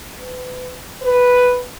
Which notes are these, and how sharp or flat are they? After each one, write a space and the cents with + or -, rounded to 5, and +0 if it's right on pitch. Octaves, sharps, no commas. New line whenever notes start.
B4 +30
B4 +0